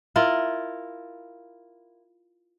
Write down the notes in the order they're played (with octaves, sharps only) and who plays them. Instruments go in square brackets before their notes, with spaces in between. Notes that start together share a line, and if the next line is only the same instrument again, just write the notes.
[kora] E4 F4 A#4